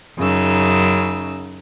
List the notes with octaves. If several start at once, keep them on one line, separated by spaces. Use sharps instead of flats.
F#2 C#3 D#4 E6